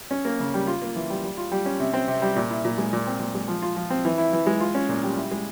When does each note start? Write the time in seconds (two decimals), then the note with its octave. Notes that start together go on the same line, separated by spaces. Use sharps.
0.11 C#4
0.25 A#3
0.40 C#3
0.54 G3
0.67 F4
0.82 A#3
0.96 E3
1.10 G3
1.24 G3
1.38 F4
1.52 G3
1.66 C#4
1.80 C3
1.94 C4
2.08 C3
2.22 G3
2.36 A#2
2.50 E4
2.65 A#2
2.78 G#3
2.93 A#2
3.07 C4
3.20 A#2
3.35 G#3
3.48 F3
3.62 F4
3.77 F3
3.90 C4
4.05 E3
4.18 E4
4.33 E3
4.47 G#3
4.60 F4
4.75 C#4
4.89 A#2
5.03 G3
5.17 E4
5.31 G#3